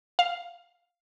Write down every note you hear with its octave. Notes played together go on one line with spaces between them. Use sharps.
F5